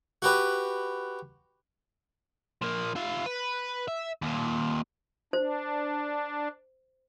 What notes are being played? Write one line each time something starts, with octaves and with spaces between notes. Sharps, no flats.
F#4 G4 B4
F3 A#3
F4 E5
B4
E5
D#2 A#2
D4 C5